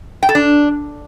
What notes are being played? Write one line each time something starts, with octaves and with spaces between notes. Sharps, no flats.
G5
A4
D4